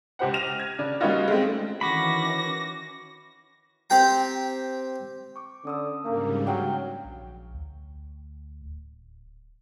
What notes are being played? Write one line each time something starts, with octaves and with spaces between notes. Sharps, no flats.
C#2 G4 C5 F#5
F6 A#6 D#7 F7
G#6
C#3 D4
G3 A#3 C#4 D#4 F4 F#4
G#3 A3 C4
D#3 E3 C#4 F#4 B5 D6 A#6
C4 G4 G5 A#5
C#6 D6
D3 C#4 D#6 E6
G#2 C#3 G3 A#3 C#4 D4
F#3 F5 G5
A#1
D2
D1